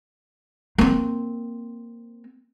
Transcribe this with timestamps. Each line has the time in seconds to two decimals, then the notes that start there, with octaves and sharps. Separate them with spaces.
0.78 A#3 C4